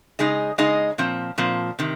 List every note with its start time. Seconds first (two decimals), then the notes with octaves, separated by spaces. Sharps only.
0.19 C#3 G#3 D#4 G#4 D#5
0.58 C#3 G#3 D#4 G#4 D#5
0.98 A#2 F3 C4
1.38 A#2 F3 C4
1.79 C3 D#3